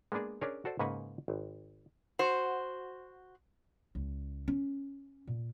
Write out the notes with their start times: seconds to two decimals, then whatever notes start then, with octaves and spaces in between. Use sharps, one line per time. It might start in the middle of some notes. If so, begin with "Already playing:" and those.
0.12 G#3 A#3 B3 D4 G#4
0.41 C#4 D4 G#4 A#4 C#5
0.65 F#4 A4 C5 D5
0.79 G#2 C#3 A#3 B4 F#5 G#5
1.28 G#1
2.19 F#4 C5
3.95 C#2
4.48 C#4
5.27 A#2